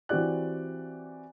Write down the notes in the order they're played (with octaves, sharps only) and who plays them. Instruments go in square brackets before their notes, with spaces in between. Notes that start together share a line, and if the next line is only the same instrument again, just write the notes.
[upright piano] E3 C4 F#4 G4 D5 F#6